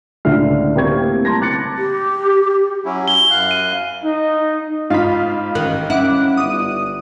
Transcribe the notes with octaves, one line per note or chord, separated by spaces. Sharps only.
C#2 A2 D3 E5 F6 C7
A2 A#3 C4 G4 C#6 G#6
A5 A#5 C6 G#6 A#6
D6 F#6 A6 C#7
G4
F#3 C#4 E4
G7
F#2 F5 F#6
D#7
D#4
G#2 D#4 F4 F5 B5
A1 D#3 F#6
C#4 E4 F#5 D6
G1 D#6